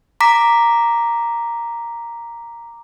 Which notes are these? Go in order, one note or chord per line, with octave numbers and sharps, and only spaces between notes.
A#5 D6 B6